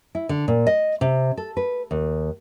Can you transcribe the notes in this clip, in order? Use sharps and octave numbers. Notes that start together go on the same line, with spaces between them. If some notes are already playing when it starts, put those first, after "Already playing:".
E4
D3
A#2
D#5
C3
A4
B4
D#2